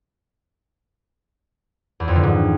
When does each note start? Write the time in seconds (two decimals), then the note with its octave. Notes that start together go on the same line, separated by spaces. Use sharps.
2.00 E2
2.08 F2
2.16 D3
2.23 G#2